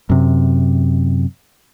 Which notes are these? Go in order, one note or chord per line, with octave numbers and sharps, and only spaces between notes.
F#2 C3